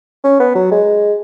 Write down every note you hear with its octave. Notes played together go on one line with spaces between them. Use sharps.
C#4
B3
F#3
G#3